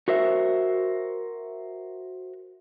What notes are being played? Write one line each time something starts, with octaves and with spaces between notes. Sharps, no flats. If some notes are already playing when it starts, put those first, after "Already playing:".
F#4 A#4 C5 E5